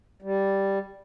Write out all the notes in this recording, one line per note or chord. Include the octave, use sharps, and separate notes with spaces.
G3